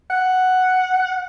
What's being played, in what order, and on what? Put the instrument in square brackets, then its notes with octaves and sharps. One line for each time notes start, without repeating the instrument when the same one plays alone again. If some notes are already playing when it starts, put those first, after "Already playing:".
[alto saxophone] F#5